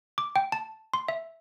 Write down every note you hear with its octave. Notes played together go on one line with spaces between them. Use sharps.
D6
G5
A5
C6
E5